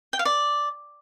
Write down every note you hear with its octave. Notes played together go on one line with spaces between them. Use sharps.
G5
F5
D5